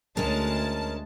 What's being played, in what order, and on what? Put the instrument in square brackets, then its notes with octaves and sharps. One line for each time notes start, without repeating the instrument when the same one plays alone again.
[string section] D2 G#3 A5 [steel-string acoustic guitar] C#4 A#4